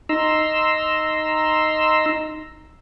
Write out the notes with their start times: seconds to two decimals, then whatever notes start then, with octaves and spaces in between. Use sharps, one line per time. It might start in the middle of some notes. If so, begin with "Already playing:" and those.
0.09 D#4 A#5 C6 E6